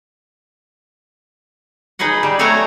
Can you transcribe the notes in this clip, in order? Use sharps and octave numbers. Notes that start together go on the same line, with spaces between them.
D#4 G#4 B4 D#5 F#5
G3
F#3 A3 F#4 C#5 G#5 A#5